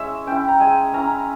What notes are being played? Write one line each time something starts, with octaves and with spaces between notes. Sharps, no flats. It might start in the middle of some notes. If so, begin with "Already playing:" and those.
Already playing: G#3 C#4 E4 C#5 E5
C#4 E4 G5
A#5
G#3 G#5
C#4 E4 A#5